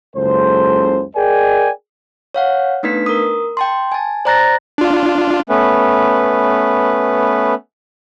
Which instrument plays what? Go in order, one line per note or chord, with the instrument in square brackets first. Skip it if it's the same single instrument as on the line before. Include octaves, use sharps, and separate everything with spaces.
[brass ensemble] F#1 C#2 A4 C5
G#4 A#4 D5 D#5 G5 G#5
[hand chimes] C#5 F5 F#5
A3 B3 D4 D#4 B4 B6
A#4 D#6
G5 A5 C6
G#5 A5
C5 D5 A#5 F#6 A6 A#6
[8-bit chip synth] D4 F4
[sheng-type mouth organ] A3 B3 C#4 B4